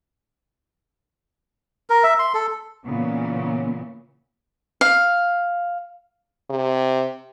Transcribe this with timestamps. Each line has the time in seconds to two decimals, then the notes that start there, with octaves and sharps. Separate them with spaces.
1.90 A#4
2.03 E5
2.19 C6
2.34 A4
2.84 A#2 C#3 E3 A#3 B3 C#4
4.81 F5
6.50 C3